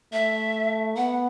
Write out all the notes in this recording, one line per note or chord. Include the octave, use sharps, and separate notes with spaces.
A3 E5
B3 F#5